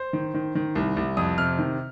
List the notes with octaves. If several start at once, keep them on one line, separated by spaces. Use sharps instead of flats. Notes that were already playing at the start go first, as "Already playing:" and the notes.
Already playing: C5
D#3
D#3
D#3
C2
C2
F2 D#6
C3 F6
D#3